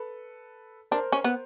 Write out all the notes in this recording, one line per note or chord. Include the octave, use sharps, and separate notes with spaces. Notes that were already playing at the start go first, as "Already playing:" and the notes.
Already playing: A4 B4
D4 A#4 C5
C#4
B3